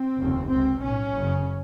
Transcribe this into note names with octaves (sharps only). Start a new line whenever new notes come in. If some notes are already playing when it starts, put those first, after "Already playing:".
Already playing: C4
F1 D#2 C#3
C#2 C3 C4
B1 A2 C#4
F#1 F#2 C#3